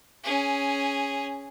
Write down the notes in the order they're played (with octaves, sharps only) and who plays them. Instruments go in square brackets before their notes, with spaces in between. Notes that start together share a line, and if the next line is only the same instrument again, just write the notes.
[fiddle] C#4 G#4